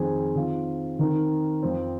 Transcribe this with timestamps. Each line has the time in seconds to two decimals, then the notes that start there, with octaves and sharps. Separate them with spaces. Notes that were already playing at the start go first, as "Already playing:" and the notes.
Already playing: F2 D#3 C4 G#4
0.35 D#3 C4 F4
0.99 D#3 C4 D#4 A#4
1.63 F2 F3 C4